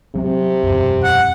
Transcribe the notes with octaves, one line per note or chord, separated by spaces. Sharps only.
C3 F#3 C4
E1 F#2
F#5